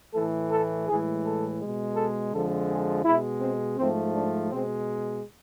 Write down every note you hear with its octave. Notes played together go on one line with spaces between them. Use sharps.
A2 E3 A3 A4
A4
A2 E3 G#3 G#4
A4
B2 G#3
A4
F2 D3 F3 G#3 A4
G#4
B2 G#3 E4
C4
G#2 F3 A3 C4
D4
B2 G#3 C4